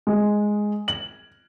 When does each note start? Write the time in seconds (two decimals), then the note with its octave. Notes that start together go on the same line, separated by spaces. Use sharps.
0.07 G#3
0.88 F#7